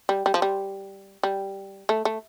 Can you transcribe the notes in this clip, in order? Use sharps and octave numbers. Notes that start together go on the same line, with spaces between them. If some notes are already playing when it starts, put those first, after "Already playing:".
G3
G3
F3
G3
G3
A3
A3